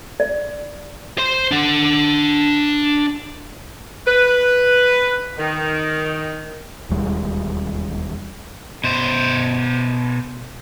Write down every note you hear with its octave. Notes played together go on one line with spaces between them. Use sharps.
D5
C5 C6
D4 F#5
B4
D#3
E1 D#2 G3 G#3
B2 C5